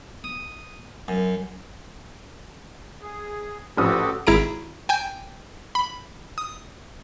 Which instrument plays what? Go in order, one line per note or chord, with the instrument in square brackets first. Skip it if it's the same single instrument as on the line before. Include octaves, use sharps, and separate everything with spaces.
[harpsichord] D#6
F#2
[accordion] G#4
[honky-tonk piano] A1 F3 D#6 [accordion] F#4 G4 A4
[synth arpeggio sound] G#1 E4 G#4 A#5 D7
G5 G#5 G6
B5
D#6